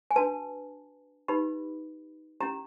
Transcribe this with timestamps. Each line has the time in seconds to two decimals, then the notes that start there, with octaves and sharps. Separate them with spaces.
0.11 G#5
0.16 D4 F#4 B4 A5
1.28 D#4 G4 B4 B5
2.40 C#4 E4 G4 A#5